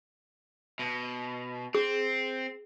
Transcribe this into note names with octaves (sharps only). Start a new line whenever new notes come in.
B2
C4 G#4